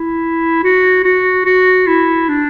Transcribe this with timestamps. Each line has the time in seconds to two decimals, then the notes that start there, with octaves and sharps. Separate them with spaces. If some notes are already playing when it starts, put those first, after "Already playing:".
Already playing: E4
0.63 F#4
1.04 F#4
1.46 F#4
1.87 E4
2.29 D4